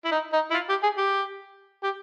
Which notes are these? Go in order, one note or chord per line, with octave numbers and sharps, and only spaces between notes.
E4
D#4
D#4
E4
F4
G4
G#4
G4
G4